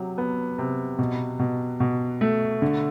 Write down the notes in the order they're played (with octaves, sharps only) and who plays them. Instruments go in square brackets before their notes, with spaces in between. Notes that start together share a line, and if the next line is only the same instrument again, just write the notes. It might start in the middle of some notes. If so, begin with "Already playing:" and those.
Already playing: [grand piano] C3 F#3
B3
C3
B2
B2
B2
A3
D3